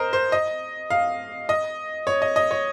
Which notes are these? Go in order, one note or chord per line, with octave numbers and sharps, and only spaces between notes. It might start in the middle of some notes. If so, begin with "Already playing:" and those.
Already playing: A#4 C5 D#5
C5
D#5
F5
D#5
C#5
D#5
D#5
C#5